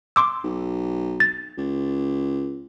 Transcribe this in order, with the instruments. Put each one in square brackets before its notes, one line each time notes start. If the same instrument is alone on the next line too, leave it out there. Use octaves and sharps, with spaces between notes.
[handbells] C6 D6 E6
[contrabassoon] B1
[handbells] A6
[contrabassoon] C#2